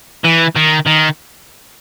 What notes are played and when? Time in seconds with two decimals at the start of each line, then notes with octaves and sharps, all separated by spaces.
0.24 E3
0.56 D#3
0.86 D#3